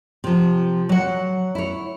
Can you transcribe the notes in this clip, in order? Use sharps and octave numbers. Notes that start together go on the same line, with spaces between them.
C3 F3
F#3 F#5
E4 C#5